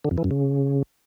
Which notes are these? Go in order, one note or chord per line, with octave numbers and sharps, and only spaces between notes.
D3
F2
E3
F#2
C#3